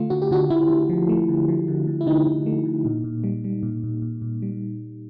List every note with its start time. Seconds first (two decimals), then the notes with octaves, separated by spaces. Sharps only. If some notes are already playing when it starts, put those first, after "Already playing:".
Already playing: D3 A3 F4
0.10 D3 F#4
0.22 G4
0.31 D3 F#4
0.50 D3 E4
0.69 D3
0.89 F3
1.09 A3
1.29 D3
1.49 F3
1.68 D3
1.87 D3
2.01 E4
2.06 D3 D#4
2.27 D3
2.46 A3
2.65 D3
2.85 A#2
3.04 A#2
3.24 G3
3.44 G3
3.63 A#2
3.84 A#2
4.02 A#2
4.22 A#2
4.42 G3